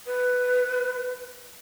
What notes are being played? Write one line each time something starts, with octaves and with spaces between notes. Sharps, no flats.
B4